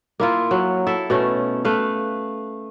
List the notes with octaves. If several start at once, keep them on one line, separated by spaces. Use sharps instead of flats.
A#3 E4 F4
F#3
E4 A4 E5
B2 A3 C#4
A3 B4 F5